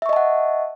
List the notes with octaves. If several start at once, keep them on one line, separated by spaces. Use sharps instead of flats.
D#5 E5 F#5 A5 C#6